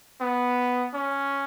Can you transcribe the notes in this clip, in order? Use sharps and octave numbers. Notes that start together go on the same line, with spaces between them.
B3
C#4